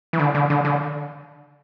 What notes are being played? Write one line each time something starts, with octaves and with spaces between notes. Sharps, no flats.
E3
D3
D3
D3
D3